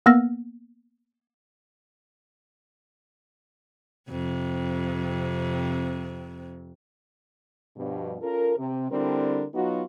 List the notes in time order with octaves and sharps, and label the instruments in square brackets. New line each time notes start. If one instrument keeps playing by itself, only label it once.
[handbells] A#3 B3 E6 F6 A#6
[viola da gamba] F2 C3
[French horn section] G2 B2 F3
C#4 F4 A4 A#4
C3
D3 G3 C4 D4 E4 A#4
F#3 B3 D#4 F4 F#4